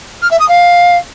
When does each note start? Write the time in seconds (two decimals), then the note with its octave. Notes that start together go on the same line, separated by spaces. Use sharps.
0.22 F6
0.31 E5
0.40 D#6
0.48 F5